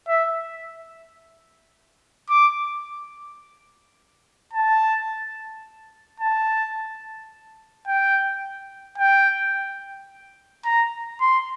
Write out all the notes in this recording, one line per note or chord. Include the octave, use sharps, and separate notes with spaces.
E5
D6
A5
A5
G5
G5
A#5
C6